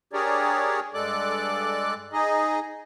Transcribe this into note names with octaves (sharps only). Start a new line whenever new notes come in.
D4 G4 G#4 A#4 C#5 D5
G2 G#3 A4 D5 D6 F#6
D#4 G#4 D#5